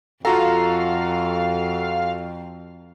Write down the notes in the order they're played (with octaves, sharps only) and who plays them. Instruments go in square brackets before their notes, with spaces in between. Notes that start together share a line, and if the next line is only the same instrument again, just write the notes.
[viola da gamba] F2 [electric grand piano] F4 F#4 A4 [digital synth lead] F5 [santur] A#5